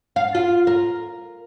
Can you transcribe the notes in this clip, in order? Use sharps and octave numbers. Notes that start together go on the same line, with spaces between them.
F5
F4
A#4